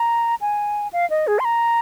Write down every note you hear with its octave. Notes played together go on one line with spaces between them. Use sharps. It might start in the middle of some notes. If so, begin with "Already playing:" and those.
Already playing: A#5
G#5
F5
D#5
G#4
C6
A#5